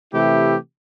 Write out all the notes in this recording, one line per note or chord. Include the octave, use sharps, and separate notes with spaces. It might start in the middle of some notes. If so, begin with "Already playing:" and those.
C3 E3 A3 E4 G4